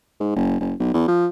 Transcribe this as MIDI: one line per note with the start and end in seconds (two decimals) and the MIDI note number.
0.20 0.33 44
0.36 0.59 30
0.60 0.74 30
0.80 0.92 35
0.94 1.05 40
1.08 1.27 53